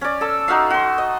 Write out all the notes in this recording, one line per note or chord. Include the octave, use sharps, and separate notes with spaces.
C#4 D5
A4 E6
D#4 F#4 E5 F5
F#4 C6
D#5